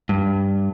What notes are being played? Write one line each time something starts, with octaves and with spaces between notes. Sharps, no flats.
G2